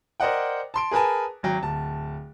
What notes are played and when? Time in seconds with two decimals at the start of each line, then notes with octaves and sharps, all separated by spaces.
0.20 A#4 C5 D5 D#5 F#5 G5
0.74 A5 C6 D7
0.91 G#4 A#4 B4 G#5 A5
1.43 G#1 F#3 G5
1.63 D1 A5